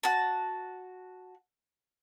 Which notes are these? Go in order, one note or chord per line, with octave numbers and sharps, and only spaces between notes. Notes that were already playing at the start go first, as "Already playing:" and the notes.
F#4 A5